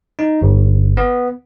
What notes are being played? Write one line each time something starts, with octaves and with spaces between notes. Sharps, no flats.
D#4
G1
B3